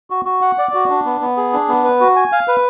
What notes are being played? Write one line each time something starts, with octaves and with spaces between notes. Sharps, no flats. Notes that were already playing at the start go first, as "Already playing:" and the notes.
F#4
F#4
F#5
D5
F#4
D4
B3
B3
G#4
D4
B3
B4
F#4
G#5
F5
B4